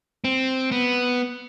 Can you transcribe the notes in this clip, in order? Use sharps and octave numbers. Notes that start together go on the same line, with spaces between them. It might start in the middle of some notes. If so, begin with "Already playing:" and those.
C4
B3